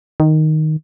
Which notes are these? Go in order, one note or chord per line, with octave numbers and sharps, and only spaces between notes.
D#3